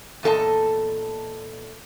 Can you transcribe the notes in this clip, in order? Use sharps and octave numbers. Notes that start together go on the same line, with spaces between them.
E2 A#2 A4 D#5 A5